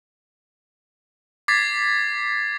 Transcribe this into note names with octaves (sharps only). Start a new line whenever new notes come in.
D6 G#6 A6 B6 C7